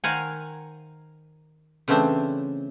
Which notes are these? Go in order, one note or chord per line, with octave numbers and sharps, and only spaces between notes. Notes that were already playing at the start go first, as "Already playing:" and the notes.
D#3 A#4 C5 F5 F#5 G#5
C#3 E3 A3 C4 D4